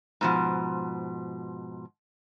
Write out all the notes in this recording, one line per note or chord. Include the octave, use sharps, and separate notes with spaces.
G#2 B2 F3